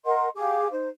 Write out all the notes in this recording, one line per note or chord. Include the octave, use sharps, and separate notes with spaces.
A#4 D#5 F#5 C6
G4 G#4 F5 D6
D#4 C5